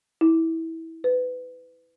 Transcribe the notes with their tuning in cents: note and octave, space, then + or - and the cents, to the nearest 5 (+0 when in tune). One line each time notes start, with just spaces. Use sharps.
E4 -20
B4 +25